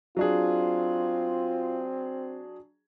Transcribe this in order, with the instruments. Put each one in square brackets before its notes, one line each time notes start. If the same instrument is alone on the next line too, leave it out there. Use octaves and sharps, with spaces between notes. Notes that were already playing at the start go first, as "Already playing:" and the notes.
[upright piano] F#3 D4 G#4 [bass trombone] C4 [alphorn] F4